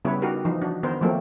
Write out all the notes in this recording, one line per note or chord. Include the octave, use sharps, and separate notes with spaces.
C#3 G3 B3 E4 B4 C#5
D#4 F#4 G4 A#4
E3 F3 D#4
D4 F#4
D#3 B3 A#4 C5
F3 F#3 A3 A#3 C4